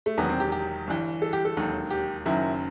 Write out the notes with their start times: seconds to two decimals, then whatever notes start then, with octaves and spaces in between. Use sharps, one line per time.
0.06 A3
0.17 E1 E2 D#3 F#3 B3
0.29 C4
0.40 G4
0.52 G4
0.87 G1 G2 E3
1.22 A4
1.33 G4
1.45 A4
1.56 E1 D#2 D#3 F#3
1.90 G4
2.25 F#1 F#2 D#3 F#3 E4